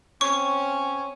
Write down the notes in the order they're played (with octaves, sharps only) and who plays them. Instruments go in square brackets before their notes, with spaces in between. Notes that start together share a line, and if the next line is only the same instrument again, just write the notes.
[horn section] C4 C#4 [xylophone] C#6